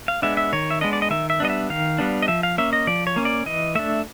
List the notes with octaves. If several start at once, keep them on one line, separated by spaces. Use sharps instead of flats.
F5
G#3 B3 D4 E5
E5
D#3 C#5
E5
G#3 B3 D4 D#5
D5
D#5
D#3 E5
E5
G3 B3 D4 D#5
E5
D#3 F5
G3 B3 D4
D#5
F3 E5
F5
A#3 C#4 E5
D#5
F3 D5
C#5
A#3 C#4
D5
E3 D#5
A3 D4 E5